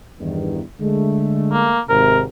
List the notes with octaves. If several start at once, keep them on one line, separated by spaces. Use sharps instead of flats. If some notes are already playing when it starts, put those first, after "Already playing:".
E2 G2 D#3
D3 G#3 A3
A#3
G#1 C3 A#4